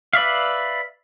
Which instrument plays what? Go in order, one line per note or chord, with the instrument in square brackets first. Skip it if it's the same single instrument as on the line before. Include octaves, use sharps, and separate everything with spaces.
[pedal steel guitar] B4 D5 E5 F5